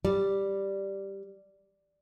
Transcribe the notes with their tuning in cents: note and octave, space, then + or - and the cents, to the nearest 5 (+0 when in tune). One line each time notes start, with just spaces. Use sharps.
G3 +0 D5 +0